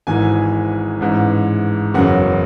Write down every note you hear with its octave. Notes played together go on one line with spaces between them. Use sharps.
G#1 G#2 E3 G#5
A1 G#2 E3
F#1 E2 C#3 F#3 F#5